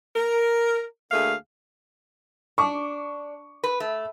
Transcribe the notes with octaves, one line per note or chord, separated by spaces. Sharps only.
A#4
D2 A3 A#3 G#4 F5
D4 C#6 D6
B4
A3